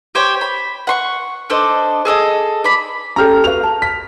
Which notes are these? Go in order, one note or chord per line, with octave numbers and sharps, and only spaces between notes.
G4 C5 C#5 G5
B5
F#5 C6 C#6
D4 A4 C5 D#5
G#4 A4 D5 D#5
D5 B5
C#4 G4 A4 A#5 F6
F#4 B4 F5 F7
A5
B6